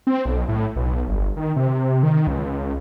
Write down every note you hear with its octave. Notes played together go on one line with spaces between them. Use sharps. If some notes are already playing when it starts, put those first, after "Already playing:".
C4
B1
A2
B1
G1
D#3
C3
D#3
C#2